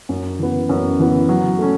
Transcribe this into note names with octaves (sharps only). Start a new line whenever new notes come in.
F#2
E3 B3
F#2
E3 B3
F#3
A3 C#4